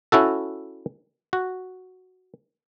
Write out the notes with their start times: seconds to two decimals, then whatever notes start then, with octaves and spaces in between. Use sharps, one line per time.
0.12 C#4 E4 F#4 A4
1.33 F#4